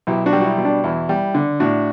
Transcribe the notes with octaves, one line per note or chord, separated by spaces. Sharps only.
B1 E4 G4
D4 F#4
G3
F#4
E4
B2
D4
E2 E4
G3
D3
A2 D4 F#4